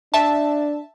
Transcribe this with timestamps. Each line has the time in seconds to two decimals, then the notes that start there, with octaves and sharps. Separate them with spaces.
0.14 D4 E5 A5